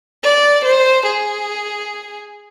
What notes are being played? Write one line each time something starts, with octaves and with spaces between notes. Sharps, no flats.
D5
C5
G#4